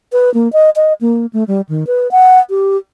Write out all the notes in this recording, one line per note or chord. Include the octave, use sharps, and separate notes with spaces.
B4
A#3
D#5
D#5
A#3
A3
G3
D#3
B4
F#5
G4